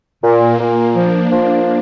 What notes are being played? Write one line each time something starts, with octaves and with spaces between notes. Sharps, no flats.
A#2 A#3
A#2
F3 D4
F3